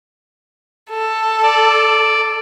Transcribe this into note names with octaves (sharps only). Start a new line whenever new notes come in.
A4
D5